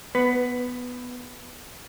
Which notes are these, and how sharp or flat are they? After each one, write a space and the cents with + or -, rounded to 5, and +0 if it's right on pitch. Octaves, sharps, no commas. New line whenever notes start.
B3 +0 B4 +15